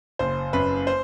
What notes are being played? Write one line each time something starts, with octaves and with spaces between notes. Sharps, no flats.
F#1 C5
F#2 B4
C5